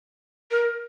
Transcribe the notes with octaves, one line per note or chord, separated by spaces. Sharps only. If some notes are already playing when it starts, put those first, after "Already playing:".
A#4